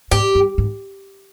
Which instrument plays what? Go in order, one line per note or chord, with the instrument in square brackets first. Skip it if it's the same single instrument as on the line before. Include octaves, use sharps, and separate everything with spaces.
[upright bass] G#2 [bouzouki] G4
[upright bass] G2
G#2